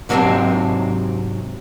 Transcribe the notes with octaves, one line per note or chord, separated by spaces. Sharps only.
G#2 C3 F#3 A#3 C4 D4